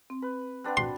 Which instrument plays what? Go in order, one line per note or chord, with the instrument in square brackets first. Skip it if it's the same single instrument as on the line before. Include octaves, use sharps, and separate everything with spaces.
[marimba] C4
[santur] B4
[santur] C4 D4 B4 [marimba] F#5 G5 F#6
[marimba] F#4 [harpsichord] C6